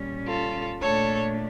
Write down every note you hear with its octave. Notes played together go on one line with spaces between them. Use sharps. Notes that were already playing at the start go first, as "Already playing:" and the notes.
Already playing: A#2 G3 C#4
F4 A4
A#2 A3 D4 A4 C#5